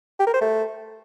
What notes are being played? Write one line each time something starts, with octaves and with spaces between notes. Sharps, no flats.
G4
A#4
C5
A3